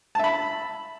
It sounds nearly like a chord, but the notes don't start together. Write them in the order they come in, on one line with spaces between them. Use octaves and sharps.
A5 E5 B5